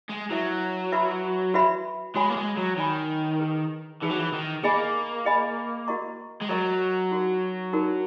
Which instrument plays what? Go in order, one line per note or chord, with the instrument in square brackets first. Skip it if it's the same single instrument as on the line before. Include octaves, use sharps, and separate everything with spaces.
[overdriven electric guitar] G#3
[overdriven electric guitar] F#3 [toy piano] E4 B4 E5
[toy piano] F#4 B4 E5 B5
F#4 B4 E5 B5
[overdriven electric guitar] G#3 [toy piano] F#4 C#5 G#5 B5
[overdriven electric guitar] A#3
G#3
F#3
[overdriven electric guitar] D#3 [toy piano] F#4 C#5 G#5 B5
[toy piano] D#4 G#4 B4
[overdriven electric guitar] E3 [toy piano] D#4 G#4 B4
[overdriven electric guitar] F#3
E3
D#3
[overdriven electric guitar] A#3 [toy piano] G#4 D#5 G#5 B5
[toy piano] G#4 D#5 G#5 B5
F#4 A#4 D#5 A#5 C#6
[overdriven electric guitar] G#3
[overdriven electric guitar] F#3 [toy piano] F#4 A#4 D#5 A#5 C#6
[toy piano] D#4 F#4 A#4
D#4 F#4 A#4